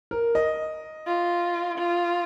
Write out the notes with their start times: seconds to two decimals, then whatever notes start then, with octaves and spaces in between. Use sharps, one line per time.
0.11 A#4
0.35 D#5
1.07 F4
1.78 F4